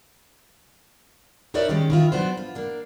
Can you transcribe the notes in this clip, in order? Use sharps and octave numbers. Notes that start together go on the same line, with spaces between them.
D#4 A#4 B4 C#5 D5 E5
D#3 G#3 C#4 G4
D#3 E4 F4
F#3 B3 D4 C5
F4
A#3 D4